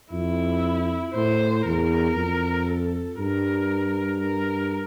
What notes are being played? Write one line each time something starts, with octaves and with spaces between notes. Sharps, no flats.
F2 E4
A2 C5
E2 A#4
F2
A4
G2 A#4
A#4